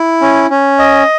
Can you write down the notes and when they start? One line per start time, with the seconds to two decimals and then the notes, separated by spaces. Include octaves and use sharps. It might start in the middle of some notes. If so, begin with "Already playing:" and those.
Already playing: E4
0.21 C#4
0.50 C#4
0.79 D#5